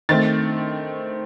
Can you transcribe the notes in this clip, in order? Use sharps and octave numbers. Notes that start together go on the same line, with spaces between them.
D#3 A3 C4 A6